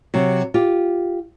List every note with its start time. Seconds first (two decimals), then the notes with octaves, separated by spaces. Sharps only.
0.14 C3 F#3
0.54 F4 G4